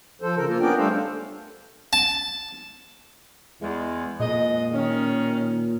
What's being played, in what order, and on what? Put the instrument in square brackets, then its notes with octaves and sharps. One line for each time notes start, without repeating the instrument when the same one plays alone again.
[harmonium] F3 A4 C5
C#3 A4 A#4
A#3 F4
B3 C#4 D4 A#4 D5 G5
G3 A3 D4 A4 C5 F5
[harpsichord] A5
[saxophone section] E2 G#3
[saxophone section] F2 G#3 D#5 [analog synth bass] A#2
[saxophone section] D#3 C#4